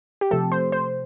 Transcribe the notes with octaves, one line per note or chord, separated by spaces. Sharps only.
G4
C3 F3 A3 A4
C5
C5